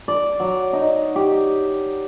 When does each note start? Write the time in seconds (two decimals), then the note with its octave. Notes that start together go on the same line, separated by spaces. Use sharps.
0.08 D5
0.40 F#3
0.73 D#4
1.16 G4